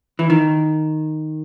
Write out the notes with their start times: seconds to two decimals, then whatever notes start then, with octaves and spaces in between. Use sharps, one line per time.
0.19 E3
0.30 D#3